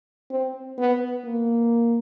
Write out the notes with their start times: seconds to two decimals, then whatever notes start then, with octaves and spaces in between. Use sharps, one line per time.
0.31 C4
0.78 B3
1.24 A#3